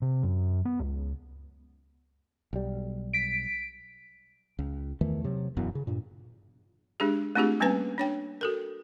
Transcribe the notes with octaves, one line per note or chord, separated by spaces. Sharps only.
C3
F#2
B3
C#2
B1 G3
B6 D7
C#2
E2 D#3 E3 A3
C3 F#3
E1 F#2 E3 B3
C#3
G2 A#2
G#3 D4 G4 G#4
A3 C4 D4 F4 G4 G#4
G3 A#3 C4 C#4 B4 G#5
D4 C#5 G5
F#4 A4 A#4